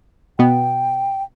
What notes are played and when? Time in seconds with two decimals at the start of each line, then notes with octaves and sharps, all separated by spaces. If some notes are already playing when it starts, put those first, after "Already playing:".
0.39 B2 B3 G5